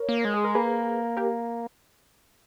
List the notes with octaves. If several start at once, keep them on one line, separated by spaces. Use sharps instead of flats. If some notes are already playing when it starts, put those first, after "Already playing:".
Already playing: A#4 C#5
A#3
G#3
G#4
A#4
A#3 G#4 B4
G4 A#4